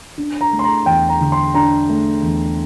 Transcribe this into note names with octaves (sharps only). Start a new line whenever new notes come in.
D4
A#5
A3
C6
A#5
E2 G5
A#5
D3
C6
D4 A#5
A3
E2